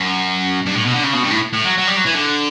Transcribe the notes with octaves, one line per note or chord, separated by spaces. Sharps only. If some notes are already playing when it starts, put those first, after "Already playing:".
Already playing: F#2
G2
A2
B2
D3
C#3
B2
G2
A2
A2
F#3
F#3
G3
F#3
E3
D3